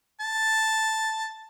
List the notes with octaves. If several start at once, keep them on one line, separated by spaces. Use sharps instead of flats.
A5